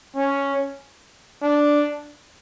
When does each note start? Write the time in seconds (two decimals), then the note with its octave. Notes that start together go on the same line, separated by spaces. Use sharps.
0.16 C#4
1.43 D4